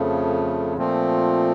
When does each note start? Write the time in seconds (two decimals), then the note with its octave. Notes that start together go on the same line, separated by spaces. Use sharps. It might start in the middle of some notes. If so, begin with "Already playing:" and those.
Already playing: F2 C#3 F3 A3
0.77 A#2 F3 A3 C4